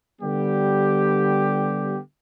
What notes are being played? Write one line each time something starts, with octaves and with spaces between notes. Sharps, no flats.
D3 G3 B3 G4